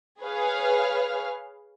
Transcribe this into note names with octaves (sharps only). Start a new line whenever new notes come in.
G#4 B4 C#5 F5